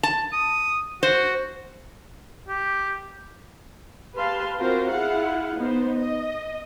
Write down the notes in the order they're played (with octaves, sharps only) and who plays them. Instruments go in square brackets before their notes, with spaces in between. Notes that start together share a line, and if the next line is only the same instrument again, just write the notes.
[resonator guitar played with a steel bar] A5
[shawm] D#6
[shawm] F#4 [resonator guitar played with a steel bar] C5
[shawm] G4
[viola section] G4 B4 F5 A5 C6
C4 F4 F#4 A#4 C5
E4 F4 G#4 F5 F#5
B3 D#4 C5
D#5